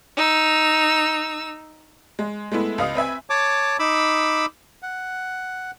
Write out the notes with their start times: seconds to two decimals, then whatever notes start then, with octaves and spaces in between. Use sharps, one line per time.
0.16 D#4 E6
2.19 G#3
2.52 G#3 A3 B3 E4
2.78 C#2 D#5 F5 D#6
2.95 C4 B4 E5 G#5
3.30 C#5 A5 D6
3.79 D#4 B5 D6 E6
4.83 F#5